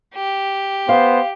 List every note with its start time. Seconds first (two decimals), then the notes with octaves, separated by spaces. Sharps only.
0.15 G4
0.89 B3 C5 F5